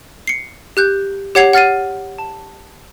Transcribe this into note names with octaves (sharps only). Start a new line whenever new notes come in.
C7 C#7
G4 F#6 G6
G4 C#5 F#5 G#6 C7 F7
F#5 F6 A6 C7 D#7
A5